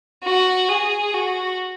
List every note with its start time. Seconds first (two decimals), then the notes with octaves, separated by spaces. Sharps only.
0.24 F#4
0.69 G#4
1.14 F#4